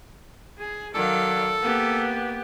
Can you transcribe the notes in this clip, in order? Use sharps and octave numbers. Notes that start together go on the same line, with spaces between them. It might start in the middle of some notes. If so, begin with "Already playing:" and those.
G#4
D#3 F#3 A4 D5 F5
A#3 B3 G4